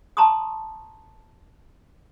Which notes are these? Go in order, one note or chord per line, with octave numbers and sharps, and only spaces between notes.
A5 A#5 C6 C#6 D#6